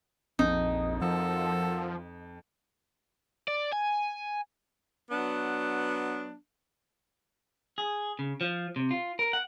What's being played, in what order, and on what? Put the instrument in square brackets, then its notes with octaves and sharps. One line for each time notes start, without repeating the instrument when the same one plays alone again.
[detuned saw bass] A#1 [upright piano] F2 [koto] D#4
[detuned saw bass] F3 [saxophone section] F#4 A4 A#4
[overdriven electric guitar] D5
G#5
[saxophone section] F#3 B3 D4
[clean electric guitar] G#4
C#3
F3
C3
F4
A#4
F#5